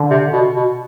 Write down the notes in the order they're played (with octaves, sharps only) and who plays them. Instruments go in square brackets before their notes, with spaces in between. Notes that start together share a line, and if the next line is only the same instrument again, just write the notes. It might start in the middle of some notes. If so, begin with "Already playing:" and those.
Already playing: [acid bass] D3
[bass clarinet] C3
B2
B2